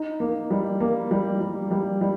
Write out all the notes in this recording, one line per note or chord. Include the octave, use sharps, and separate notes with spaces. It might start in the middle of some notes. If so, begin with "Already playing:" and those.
Already playing: D#4
A#3
G3
A#3
G3
G3
G3
G3